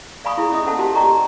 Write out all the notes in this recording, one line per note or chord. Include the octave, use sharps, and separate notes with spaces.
D5 F5 G#5 B5 C#6 D#6
E4 G#4
C#4 D#5 E5 D#6
C#4 A4 C5 F#5 A5
F#4 G4 A#4 C5 A5
F#4 D5 D#5 G5 A#5 C#6